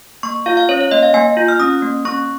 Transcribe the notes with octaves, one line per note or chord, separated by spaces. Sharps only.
A#3 C#6
F4 F5
F5
C#4 C#5
C#5
A#3 D#5
F5
A#3 G#5
F4
F6
C#4 D#6
A#3
C#4 C#6